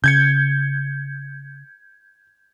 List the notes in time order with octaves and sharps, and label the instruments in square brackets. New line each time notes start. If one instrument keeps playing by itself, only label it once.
[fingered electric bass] C#3 [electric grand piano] G6 G#6 C#7